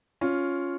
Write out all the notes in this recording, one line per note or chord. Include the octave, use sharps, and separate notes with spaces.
C#4 F4